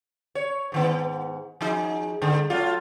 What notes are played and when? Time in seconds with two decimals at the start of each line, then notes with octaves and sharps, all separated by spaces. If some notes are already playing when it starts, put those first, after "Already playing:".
0.35 C#5
0.72 G#2 D#3 B3
1.61 F3 D#4 G#4
2.22 G2 D3
2.50 F#3 A3 F4